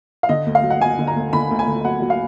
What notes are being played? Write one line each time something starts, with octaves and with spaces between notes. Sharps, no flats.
F5
D3 D#5
D2
F5
F#3
F#5
F#3 G#5
D3
A#5
D2
D3 B5
D2
G#5
D2
F#3 F#5
F#3
F5